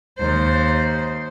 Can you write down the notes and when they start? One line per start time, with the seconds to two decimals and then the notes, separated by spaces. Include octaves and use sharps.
0.18 D#2 C5